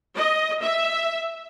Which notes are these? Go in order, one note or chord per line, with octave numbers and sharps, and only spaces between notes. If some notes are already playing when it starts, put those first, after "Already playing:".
D#5
E5